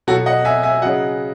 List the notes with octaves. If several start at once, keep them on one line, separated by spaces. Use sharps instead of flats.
B2 F#3 F#4 A4
D#5 F#5
E5 G#5
E5 G#5
C#3 F#3 D#5 F#5